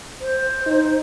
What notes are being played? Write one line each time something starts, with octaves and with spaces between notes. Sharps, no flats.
C5
D#4